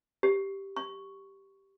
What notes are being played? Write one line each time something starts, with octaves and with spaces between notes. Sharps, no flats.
G4
C#6